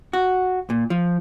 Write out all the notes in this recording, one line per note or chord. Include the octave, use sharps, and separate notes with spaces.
F#4
A#2
F3